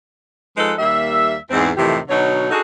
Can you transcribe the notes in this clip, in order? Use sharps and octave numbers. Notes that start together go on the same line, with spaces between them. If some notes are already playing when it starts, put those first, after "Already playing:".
F3 G#3 D#4 A4 B4
D#2 G3 A#3 E5
E2 G#2 C4
F2 A2 C3 D#3 E3 G4
B2 D3 F#3 D#4 C#5
D4 D#4 F#4 G#4 A4